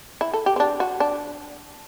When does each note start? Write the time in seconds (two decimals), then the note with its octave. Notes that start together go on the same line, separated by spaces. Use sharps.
0.21 E4
0.33 A4
0.46 G4
0.56 C4
0.60 D4
0.80 F#4
1.00 D4